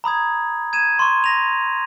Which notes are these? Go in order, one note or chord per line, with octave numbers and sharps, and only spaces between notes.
A#5 B5 D#6 G#6
G#6 D#7 E7
C6 C#6
A#6 D#7 F7